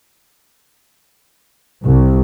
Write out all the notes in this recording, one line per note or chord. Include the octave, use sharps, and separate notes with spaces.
C2